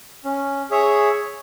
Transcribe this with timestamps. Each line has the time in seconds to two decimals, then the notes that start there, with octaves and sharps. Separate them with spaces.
0.24 C#4
0.71 G#4 C#5 E5